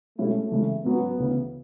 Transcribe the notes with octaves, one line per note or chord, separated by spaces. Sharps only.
B2 G#3 A3 C#4 E4
E2 C#3 G#3
G#2 F#3 B3 C#4
D2 C#3 E3